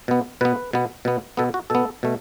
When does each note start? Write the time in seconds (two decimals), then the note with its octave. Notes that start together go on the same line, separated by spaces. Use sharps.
0.08 B2 B3
0.41 B2 B3 B4
0.73 B2 B3
1.05 B2 B3
1.37 B2 B3 A4
1.54 F#4
1.70 B2 B3 A4
2.03 B2 A3